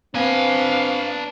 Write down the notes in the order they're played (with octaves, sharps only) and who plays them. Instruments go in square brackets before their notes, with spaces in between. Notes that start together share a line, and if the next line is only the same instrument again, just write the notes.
[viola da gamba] B3 [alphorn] C4 [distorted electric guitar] D4 G#5 [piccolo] F5